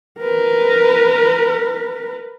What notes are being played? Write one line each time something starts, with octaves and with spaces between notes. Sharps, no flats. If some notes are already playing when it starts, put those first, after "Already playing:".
A#4 B4